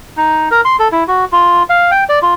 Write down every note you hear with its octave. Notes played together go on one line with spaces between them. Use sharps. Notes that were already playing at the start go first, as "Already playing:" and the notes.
D#4
A#4
C6
A4
E4
F#4
F4
F5
G5
D5
F4